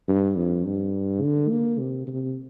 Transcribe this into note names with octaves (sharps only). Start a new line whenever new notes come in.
G2
F2
G2
D3
A#3
C3
C3